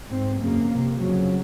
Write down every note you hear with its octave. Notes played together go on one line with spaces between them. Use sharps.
G#2 C4
F#2 C#3 A#3
F2
C3
F2 C#3 F#3